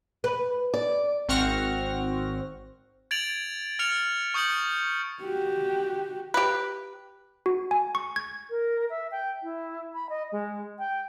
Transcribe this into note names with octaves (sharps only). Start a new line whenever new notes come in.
B4
D5
G#1 C4 F#5 C#6 F6 A#6
G#6 A6 D7 F7 F#7
F6 A6 C#7 F7
C#6 D#6 G6 C#7 F#7
F#4 G4
G4 B4
F#4
G#5
C#6
G#6
A#4
E5
G5
E4
B5
D#5
G#3
G5